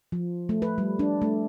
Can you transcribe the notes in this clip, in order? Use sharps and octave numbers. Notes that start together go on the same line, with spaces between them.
F3
A3
B4
G3
D4
A3